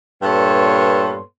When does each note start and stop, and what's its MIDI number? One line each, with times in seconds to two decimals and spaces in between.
0.23 1.21 43
0.23 1.21 46
0.23 1.21 59
0.23 1.21 69
0.23 1.21 73
0.23 1.21 84